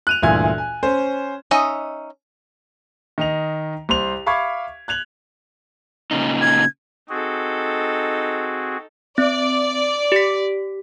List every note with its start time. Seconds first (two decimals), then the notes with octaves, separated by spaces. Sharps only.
0.07 F#6 D#7 F7
0.22 G1 D2 A#2 E3 G#5 G#6
0.58 G#5
0.83 C#4 C5
1.51 C#4 D#4 D#5 E5
3.18 D#3 D#5 F7
3.89 C2 C5 C6 F7
4.26 E5 F5 B5 C#6 D6 G#6
4.88 F#6 G#6 F7 F#7
6.11 A#2 C#3 D#4
6.42 G#6
7.09 C4 D#4 F#4 G#4 A4
9.18 C4 D5
10.12 G4 B6